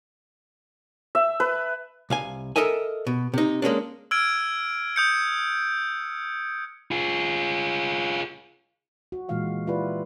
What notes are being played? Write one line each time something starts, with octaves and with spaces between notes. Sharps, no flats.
E5
B4
C2 F5 G#5
A4 A#4 D#5 E5 G#5
B2
C3 D#4
G#3 A#3 C#4 D4
E6 F6 G#6 D7 D#7
D#6 G6 C#7
F4 G#4
F#4
A#2 E3 G#3 F4 F5 F#5
E4 F4 G4 B4 D5